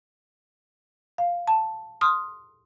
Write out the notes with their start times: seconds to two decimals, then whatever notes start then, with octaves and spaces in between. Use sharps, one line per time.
1.18 F5
1.48 A5
2.01 C6 D#6 F6